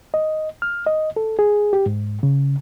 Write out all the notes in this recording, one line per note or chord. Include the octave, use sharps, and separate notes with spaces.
D#5
F6
D#5
A4
G#4
G4
G#2
C#3